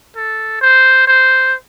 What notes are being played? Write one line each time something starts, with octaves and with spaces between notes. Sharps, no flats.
A4
C5
C5